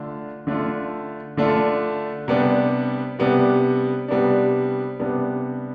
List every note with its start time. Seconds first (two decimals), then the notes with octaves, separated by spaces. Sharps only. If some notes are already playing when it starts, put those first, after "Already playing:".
Already playing: D3 A3 D4 F4
0.47 D3 A3 D4 F4
1.37 D3 A3 D4 F4
2.28 C3 G3 B3 D4
3.19 C3 G3 B3 D4
4.08 C3 G3 B3 D4
5.00 C3 G3 B3 D4